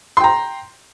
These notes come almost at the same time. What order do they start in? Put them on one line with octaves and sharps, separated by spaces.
C6 G5 A#5